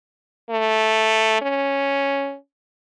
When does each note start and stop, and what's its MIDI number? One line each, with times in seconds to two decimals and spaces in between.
0.51 1.37 57
1.42 2.36 61